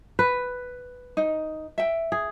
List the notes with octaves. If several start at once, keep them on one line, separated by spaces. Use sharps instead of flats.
B4
D#4
E5 G5
G#4